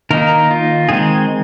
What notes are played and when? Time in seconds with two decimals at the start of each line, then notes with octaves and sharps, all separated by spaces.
0.11 D#3 A#3 D#4 A#4
0.51 F4
0.89 D#3 G#3 C4 G#4